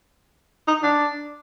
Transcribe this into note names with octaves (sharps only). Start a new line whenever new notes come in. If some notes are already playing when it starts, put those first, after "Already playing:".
D#4
D4